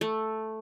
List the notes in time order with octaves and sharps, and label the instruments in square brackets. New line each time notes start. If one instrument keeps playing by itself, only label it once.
[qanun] A3